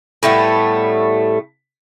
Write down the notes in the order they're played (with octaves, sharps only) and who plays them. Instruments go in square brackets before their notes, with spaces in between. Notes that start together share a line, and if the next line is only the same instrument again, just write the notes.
[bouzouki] A2 G3 A3 B3